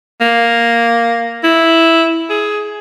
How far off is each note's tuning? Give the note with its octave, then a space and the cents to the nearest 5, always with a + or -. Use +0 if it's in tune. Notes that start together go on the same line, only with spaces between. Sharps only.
A#3 +0
E4 -5
G#4 +10